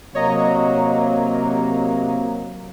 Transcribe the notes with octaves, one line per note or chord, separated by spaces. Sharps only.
C3 F#3 A#3 C#5 D#5 A#5